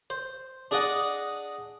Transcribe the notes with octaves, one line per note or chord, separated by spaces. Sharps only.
C5
D4 G#4 D5 D#5 F#5